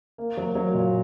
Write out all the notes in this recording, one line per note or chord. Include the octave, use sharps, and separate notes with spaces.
A#3
F#3
F#3
A#2